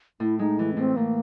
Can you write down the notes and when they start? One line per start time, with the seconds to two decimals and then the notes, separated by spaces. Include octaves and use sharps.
0.20 A2 E4
0.39 G#3 D#4
0.59 E3 E4
0.73 C#4
0.77 A2 C4
0.96 A2 A#3